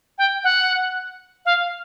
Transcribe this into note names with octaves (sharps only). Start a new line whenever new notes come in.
G5
F#5
F5